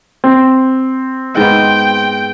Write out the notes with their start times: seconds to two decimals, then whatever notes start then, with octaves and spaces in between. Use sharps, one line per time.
0.24 C4
1.37 G#2 B3 G5